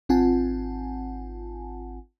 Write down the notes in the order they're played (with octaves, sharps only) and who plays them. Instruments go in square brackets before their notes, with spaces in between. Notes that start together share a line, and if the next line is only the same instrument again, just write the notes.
[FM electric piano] G#1 C4 F4 F#5 G#5 A5